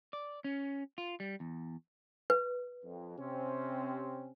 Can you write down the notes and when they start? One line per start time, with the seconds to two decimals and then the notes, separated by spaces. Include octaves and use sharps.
0.13 D5
0.44 C#4
0.98 F4
1.20 G3
1.40 E2
2.30 B4
2.84 F2
3.18 C3 C4 C#4